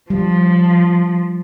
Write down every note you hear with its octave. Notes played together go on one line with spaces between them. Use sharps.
F3 G3